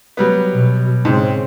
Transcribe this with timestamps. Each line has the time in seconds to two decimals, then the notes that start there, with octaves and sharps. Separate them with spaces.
0.17 F#3 G3 B3
0.52 B2
1.05 G#2 C#3 C4